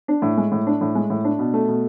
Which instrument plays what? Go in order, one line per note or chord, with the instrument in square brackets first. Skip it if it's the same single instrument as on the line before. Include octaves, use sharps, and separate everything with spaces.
[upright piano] D4
A2
G#3
A2
D4
A2
G#3
A2
D4
B2
A3
B2